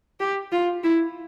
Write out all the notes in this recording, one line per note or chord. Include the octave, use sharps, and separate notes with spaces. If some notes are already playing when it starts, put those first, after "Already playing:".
G4
F4
E4